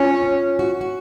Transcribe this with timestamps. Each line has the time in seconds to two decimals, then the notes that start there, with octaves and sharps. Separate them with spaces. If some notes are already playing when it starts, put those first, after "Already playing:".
Already playing: C#4 F4
0.59 F#4
0.81 F#4